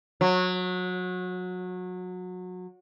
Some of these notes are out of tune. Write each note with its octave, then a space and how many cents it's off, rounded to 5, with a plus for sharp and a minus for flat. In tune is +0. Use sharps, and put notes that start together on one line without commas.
F#3 -25